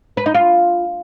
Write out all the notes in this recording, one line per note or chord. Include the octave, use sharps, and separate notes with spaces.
B4
D#4
F4